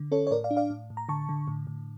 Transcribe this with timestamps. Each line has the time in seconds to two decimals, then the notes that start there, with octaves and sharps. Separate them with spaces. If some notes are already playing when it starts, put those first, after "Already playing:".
Already playing: D3
0.12 C#4 A4 C#5
0.27 C#5
0.31 A2 A#4 D5
0.44 D5 F5
0.51 D4
0.57 D5 F5
0.70 A2
0.90 A2
0.97 A#5
1.09 D3 A5 C#6
1.29 D3
1.48 A2
1.67 A2